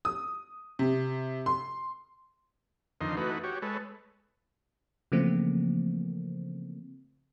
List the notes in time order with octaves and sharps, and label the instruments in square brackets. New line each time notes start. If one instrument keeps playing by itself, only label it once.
[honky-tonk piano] D#6
C3
C6
[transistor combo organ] F2 D3 D#3 D#4 C6
E3 A3 D#4 F#4 B4
F#4 G4 C#5
G#3 A4 B4 C#5
[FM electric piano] C#3 E3 F3 A3 A#3 C4